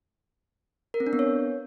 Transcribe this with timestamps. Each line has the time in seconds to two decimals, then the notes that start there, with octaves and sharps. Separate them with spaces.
0.94 A#4
1.00 C4
1.07 D4
1.13 B3
1.19 C#5